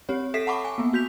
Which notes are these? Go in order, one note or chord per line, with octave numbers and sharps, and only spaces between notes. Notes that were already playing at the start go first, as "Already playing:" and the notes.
C4 G4 C#5
A4 E5 B6 C7 E7
F#5 A5 B5 C#6 D6
G#5
A#3 B3
F#4 G6 B6 F7